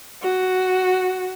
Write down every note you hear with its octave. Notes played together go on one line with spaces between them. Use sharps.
F#4